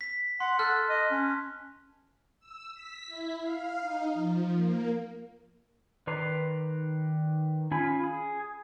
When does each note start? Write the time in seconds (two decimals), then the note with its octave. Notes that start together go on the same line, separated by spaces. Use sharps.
0.01 B6
0.40 F#5 C6
0.59 A4 A5 F6 F#6
0.89 D#5
1.11 C#4
2.40 E6
2.74 B6
3.07 E4
3.41 F5
3.80 D#4
4.14 F3
4.53 A#3
6.07 D#3 B4 D5 A#5 C6
7.71 C#4 F4 G#5 B5
8.04 G#4